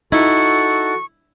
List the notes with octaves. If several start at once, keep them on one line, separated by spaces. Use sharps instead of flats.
D#4 E4 F#4 A4 C#6